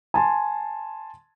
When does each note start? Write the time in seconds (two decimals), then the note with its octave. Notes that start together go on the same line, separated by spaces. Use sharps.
0.14 G#5 A5 C6